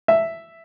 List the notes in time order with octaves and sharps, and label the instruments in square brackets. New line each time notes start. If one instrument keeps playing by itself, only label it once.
[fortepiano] E5